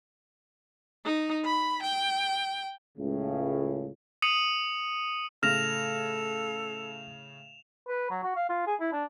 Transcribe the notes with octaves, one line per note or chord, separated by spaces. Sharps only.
D#4
B5
G5
C#2 A2 C#3
D#6 C#7 D#7 F#7
A2 C#3 A4 F6 A#6 E7 F7
B4
F#3
F#4
F5
F4
G#4
E4
D4